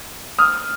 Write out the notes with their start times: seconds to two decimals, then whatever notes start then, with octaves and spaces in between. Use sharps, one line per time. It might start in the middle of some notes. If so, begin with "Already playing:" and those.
0.39 D#6 F6